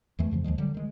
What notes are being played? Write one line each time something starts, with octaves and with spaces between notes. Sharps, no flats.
E2 E3 A3
F2 C#3 F3
D#2 D#3 F3 G#3
D3 F#3 G3
D#3 G#3